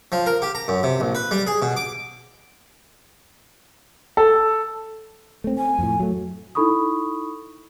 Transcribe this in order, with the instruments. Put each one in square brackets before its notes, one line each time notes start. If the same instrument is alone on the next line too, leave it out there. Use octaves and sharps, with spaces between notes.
[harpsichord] F3
A#4
G4
A#5
F#2
C3
A#1
B4
G3
G#4
B2
D6
[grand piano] A4
[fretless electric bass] A3 C4
[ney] G#5
[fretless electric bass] F2 A2
F#3 A3
[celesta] D#4 E4 A4 B5 C#6 D#6